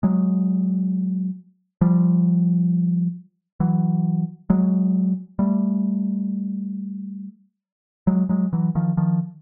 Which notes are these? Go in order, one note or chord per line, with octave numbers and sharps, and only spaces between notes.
F#3 G#3
F3 G3
E3 F#3
F#3 G#3
G3 A3
F#3 G#3
F#3 G#3
E3 F#3
D#3 F3
D#3 F3